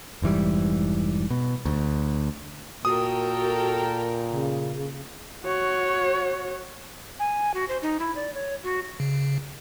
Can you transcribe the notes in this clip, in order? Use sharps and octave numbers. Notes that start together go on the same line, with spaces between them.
F1 G#2 E3 G3
B2
D2
A#2 F#4 A4 A#4 G5 D#6
C#3
F#4 C#5
G#5
F#4
C5
D#4
E4
D5
C#5
F#4
C#3